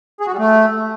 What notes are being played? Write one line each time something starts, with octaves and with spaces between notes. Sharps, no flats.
G#4
F#4
G3
A3